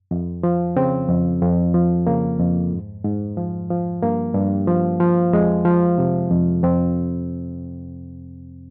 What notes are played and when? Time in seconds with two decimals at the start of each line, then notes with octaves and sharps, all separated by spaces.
0.11 F2
0.43 F3
0.76 C#3 C4
1.09 F2
1.42 F2
1.74 F3
2.07 C#3 A#3
2.39 F2
2.73 G#2
3.04 G#2
3.37 F3
3.70 F3
4.02 G2 A#3
4.35 G2
4.67 F3
5.00 F3
5.33 F2 G#3
5.65 F3
5.98 C3
6.31 F2
6.63 F2 C4